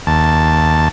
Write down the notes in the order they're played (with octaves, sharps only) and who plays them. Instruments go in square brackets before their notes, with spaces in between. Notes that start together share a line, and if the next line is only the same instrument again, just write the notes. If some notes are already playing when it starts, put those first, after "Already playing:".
[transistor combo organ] D#2 A5